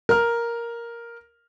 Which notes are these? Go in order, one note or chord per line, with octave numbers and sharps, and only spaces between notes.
A#4 F6